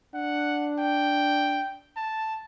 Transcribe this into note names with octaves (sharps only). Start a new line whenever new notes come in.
D4 F#5
G5
A5